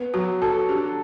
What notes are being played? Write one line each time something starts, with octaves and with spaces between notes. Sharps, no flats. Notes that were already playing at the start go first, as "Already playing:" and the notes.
Already playing: B3
F#3 F#4
F#4 A4
D4 G4